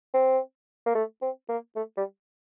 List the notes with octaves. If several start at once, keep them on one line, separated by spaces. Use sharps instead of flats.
C4
A#3
A3
C4
A#3
A3
G3